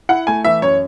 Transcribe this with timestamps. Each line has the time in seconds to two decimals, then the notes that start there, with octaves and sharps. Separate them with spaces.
0.09 E4 F#5
0.27 A3 G#5
0.45 E3 E5
0.62 F#2 C#5